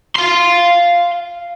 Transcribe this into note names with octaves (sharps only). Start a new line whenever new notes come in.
F5 C6